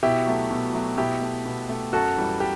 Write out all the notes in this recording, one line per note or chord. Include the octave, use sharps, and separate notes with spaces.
B2 E4 G4
F#3 A3
B2
F#3 A3
B2 E4 G4
A3
B2
A3
F#2 F#4 A4
E3 G3
G4